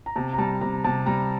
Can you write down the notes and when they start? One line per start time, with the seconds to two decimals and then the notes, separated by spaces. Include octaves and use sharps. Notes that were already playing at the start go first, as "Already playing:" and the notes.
0.06 A#5
0.16 C3 A5
0.33 A#5
0.38 G3 A5
0.61 C3 A#5
0.84 C3 A5
1.06 G3 A#5